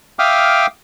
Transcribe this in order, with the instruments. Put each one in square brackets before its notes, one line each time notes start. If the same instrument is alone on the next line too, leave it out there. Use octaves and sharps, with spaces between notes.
[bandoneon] E5 F5 G5 D6 D#6 F6